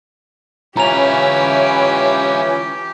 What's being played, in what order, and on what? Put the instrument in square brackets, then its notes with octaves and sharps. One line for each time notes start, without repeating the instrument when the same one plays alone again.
[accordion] E3 C#4 [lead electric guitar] F4 B4 [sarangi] G4 [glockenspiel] A#5 F7